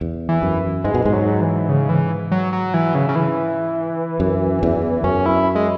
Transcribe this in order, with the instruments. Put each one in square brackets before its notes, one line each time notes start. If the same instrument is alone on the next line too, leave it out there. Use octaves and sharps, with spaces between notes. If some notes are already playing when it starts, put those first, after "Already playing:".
[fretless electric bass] E2
[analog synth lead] E3
[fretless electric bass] F#2
[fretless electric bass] G#2 [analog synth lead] G#3
[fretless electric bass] B2
[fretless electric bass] G#2 [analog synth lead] G#3
[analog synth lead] F#3
E3
C#3
E3
F#3
F#3
E3
C#3
C#3
E3
[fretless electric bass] F#2
E2
[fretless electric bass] F#2 [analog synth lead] C#4
[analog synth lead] E4
G#3